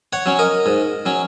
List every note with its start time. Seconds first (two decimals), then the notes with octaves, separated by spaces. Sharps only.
0.13 C#5 F#5
0.26 F#3 C#4
0.39 A#4 D#5
0.66 G#2
1.06 F#3 C#4